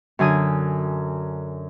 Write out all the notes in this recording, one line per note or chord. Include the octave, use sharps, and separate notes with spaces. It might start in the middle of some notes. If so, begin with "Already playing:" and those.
F#2 D3 G#5 D#6